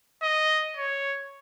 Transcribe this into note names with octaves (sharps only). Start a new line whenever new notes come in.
D#5
C#5